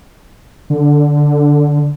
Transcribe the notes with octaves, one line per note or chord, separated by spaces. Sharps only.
D3